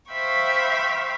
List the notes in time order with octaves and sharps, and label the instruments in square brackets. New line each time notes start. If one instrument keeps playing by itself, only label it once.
[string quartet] C5 E5 F5 G5 B5 C#6